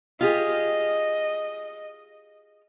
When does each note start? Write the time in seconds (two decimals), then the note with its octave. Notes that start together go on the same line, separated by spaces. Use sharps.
0.21 F4 G4 G#4 D#5